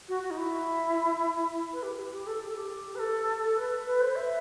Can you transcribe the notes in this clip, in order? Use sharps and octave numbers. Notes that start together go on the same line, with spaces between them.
F#4
F#4
D#4
E4
B4
G4
G4
G4
A4
G4
A4
G4
B4
A4
B4
B4
C5
E5